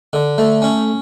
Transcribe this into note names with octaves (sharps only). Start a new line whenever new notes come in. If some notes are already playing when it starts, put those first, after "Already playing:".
D3
A3
C#4